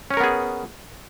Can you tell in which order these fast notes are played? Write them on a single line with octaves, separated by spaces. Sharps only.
C#4 C#5 A#4 B3 G#4